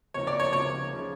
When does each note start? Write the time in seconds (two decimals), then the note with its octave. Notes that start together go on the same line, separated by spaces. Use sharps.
0.14 C#2 C3 F3 A#3 D#4 C#5
0.27 D5
0.40 C#5
0.53 C#2 C3 F3 A#3 D#4 C#5
0.91 C#3 F3